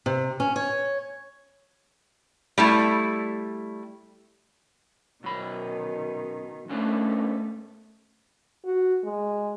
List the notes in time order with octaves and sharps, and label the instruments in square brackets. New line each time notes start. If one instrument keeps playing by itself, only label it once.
[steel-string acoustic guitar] C3
C#4
C#5
[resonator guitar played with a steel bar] G3 A3 E4
[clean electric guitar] F#2 B5 [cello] B2 D#3
[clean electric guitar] B2 C#4 D4 [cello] A3
[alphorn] F#4
G#3